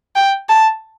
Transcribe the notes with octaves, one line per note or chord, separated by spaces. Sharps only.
G5
A5